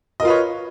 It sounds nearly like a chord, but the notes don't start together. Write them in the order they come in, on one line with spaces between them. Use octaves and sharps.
D#5 A#4 F4 B4 C#5